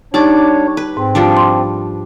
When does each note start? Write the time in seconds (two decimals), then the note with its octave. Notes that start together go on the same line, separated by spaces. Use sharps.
0.14 G3 D4 D#4 C#5 A5 D6
0.77 B4
0.97 G#2 C4
1.15 F3 G3 D4
1.37 C6